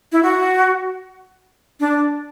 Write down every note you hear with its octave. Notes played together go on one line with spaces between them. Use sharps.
E4
F#4
D4